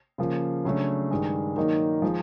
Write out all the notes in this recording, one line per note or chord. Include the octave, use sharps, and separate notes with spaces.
C#3 F3 A#3
C#3 F#3 A3 D4
G2 D#3 G#3
D#3 F#3 A#3 D#4
F3 G#3